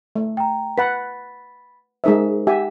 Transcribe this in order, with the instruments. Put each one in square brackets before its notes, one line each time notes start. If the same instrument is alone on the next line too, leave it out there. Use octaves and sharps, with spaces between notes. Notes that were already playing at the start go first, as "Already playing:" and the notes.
[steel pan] A3
[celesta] G5 A#5
[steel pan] B4 F#5 [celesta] B5 A6 B6
[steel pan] G#3 D#4 E5 [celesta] G#4 A#4 C5
[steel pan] G4 E5 G#5 [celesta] F#5